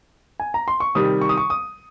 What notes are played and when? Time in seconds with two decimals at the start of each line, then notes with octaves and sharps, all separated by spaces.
0.40 G#5
0.54 A#5
0.68 C6
0.80 C#6
0.95 C3 D#3 G3 D#6
1.21 C#6
1.29 D#6
1.37 C#6
1.50 D#6